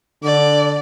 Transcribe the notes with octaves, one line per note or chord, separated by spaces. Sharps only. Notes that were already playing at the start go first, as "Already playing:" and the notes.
D3 D5